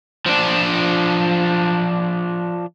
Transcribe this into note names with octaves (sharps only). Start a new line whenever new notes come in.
F3 D4